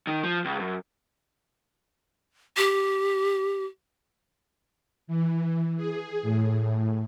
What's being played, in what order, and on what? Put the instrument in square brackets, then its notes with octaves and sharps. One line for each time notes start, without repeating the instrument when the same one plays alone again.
[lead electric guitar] D#3
F3
C#2
F#2
[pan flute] G4
[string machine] E3
G#4
A2